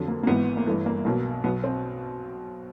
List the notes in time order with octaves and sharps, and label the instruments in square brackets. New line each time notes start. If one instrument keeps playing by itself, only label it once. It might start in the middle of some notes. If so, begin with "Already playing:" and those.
Already playing: [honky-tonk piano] F2 D3 F#3
A#3
A#3
G#1 G#2 E3 B3
A#3
G1 G2 E3 A3
A#3
B1 B2 F#3 A#3
B1 B2 F#3 B3
C4